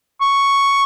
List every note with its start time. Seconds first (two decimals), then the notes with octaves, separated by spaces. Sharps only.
0.21 C#6